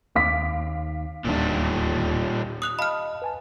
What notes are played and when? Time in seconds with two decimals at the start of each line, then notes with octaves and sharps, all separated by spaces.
0.16 D#2 F5 D6 B6
1.25 D1 D#2 A#2 G3 D4
2.62 D#6 F#6 F7
2.79 D#5 F5 A5 B5 F6
3.22 B4 G#5 A5